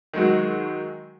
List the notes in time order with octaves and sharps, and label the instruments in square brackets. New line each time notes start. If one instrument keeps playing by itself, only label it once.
[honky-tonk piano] D#3 F#3 G#3 F#4